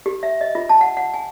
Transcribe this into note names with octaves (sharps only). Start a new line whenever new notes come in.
G4
E5
D#5
F4
A5
F#5
F#5
G#5